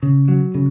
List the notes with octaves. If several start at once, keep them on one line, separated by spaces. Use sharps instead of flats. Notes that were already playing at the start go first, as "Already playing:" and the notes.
C#3
F#3
C#3